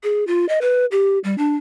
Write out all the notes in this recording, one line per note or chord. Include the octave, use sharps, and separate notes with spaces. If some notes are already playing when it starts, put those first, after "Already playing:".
G#4
F4
D#5
B4
G4
G3
D4